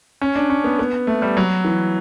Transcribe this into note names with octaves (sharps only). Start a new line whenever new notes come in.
C#4
D4
C#4
B3
B3
A3
G3
F#3
E3